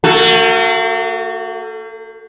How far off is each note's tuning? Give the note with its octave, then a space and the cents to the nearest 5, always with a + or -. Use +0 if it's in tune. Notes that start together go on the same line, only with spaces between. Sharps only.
A#3 -45 F#4 +0 A4 +0